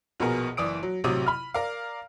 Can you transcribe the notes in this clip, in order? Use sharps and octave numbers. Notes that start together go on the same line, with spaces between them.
A#1 B2 B3 G#4 A#4
F#1 E3 D5 D#6 D7
F#3
A1 C3 F#3 D6 D#6 D#7
B5 F6
A#4 D5 F5